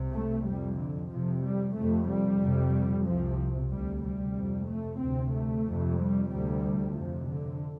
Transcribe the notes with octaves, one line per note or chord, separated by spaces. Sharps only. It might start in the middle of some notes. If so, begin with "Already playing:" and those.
Already playing: C2 C3
A3
F2 C3 G3
D3
F2 C3 F3
G3
F2 C3 A3
G3
F2 C3
C2 C3 F3
D2 C3 G3
G3
F2 C3
A3
D2 C3 C4
A3
F2 C3
G3
D2 C3 G3
F2 C3 F3
D3